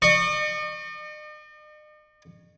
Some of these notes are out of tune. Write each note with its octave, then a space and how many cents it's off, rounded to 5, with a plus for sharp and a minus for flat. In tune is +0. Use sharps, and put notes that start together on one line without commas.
D#5 -45 C#6 +0